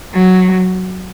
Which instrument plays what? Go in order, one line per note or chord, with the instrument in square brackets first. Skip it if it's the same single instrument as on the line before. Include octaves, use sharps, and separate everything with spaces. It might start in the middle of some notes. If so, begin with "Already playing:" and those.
[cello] F#3